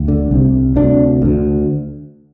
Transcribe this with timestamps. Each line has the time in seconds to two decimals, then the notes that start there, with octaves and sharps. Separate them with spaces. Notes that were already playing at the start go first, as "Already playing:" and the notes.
Already playing: D2
0.08 D3
0.31 C2 C3
0.76 D2 C3 D4
1.22 D2 D3